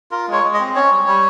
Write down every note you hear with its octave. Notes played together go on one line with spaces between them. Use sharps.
F4 A#4
G#3 C#5
G#3
D#5
C4
C#4 C#5
G3
G3